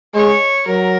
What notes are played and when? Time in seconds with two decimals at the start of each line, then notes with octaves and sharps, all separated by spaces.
0.14 G#3 C#5
0.67 F#3 A#4